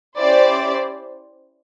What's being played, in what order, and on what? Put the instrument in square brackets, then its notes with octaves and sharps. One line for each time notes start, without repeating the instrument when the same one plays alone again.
[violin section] C#4 E4 G4 C5 D5